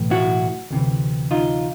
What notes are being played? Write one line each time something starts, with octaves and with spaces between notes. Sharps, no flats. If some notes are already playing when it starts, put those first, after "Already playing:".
Already playing: B1 A2 E3
E4 F#4
D2 C3 E3
D#4 F4